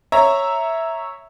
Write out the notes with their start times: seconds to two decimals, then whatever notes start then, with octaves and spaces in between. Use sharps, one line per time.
0.12 C#5 E5 A#5